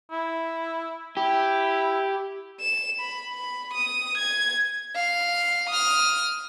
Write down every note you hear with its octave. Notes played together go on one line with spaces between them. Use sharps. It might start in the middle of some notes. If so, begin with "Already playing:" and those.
E4
E4 G4
E7
B5
B5
D#6
G#6
F5
D#6 F6